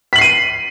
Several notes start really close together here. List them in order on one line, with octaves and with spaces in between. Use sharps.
B6 F#7 C7 D#7